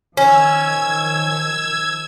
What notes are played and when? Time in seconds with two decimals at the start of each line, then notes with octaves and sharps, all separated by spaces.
0.17 D#3 F3 C#4 E6 G#6